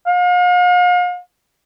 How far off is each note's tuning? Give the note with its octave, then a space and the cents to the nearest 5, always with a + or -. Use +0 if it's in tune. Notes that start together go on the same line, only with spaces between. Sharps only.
F5 +40